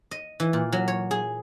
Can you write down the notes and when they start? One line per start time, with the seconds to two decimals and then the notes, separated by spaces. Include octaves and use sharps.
0.11 D#5
0.40 E3
0.53 A#2
0.72 F#3
0.88 C#5
1.11 G#4